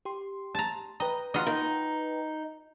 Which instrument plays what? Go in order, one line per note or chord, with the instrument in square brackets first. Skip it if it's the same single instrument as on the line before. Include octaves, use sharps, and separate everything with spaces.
[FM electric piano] G4 C6
[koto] A5 A#5
[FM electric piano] B4 G5 A#5 [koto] D#5
[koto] F4 F#4 D#5
[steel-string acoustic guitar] D#4